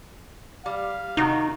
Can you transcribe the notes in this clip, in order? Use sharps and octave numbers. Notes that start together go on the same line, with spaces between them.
G3 F5
C3 D#3 D#4 F#4